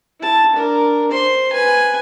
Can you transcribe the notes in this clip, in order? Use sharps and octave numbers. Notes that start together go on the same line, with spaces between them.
E4 A5
D4 A#4
C5 C6
B4 G#5